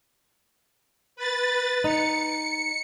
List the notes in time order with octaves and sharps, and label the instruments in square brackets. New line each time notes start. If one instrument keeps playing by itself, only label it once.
[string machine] B4 A6
[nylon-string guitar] D#4 [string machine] C#7